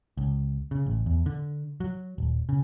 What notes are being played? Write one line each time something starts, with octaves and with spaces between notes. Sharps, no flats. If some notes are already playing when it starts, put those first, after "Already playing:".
C#2
C#3
A1
E2
D3
F#3
D#1
C#3